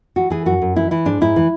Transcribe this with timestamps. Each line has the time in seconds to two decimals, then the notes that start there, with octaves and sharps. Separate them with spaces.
0.16 E3 F#4
0.30 E3 G#4
0.46 F#2 F#4
0.62 F#2
0.76 E3 E4
0.91 E3 E4
1.05 G#2 D4
1.21 G#2 E4
1.36 E3